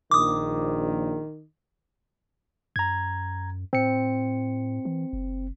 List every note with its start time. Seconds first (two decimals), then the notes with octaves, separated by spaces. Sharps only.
0.11 A#1 D#3 D6 D#6
2.76 F#2 A#5 G#6
3.73 A2 C4 C#7
4.85 E3
5.13 F#1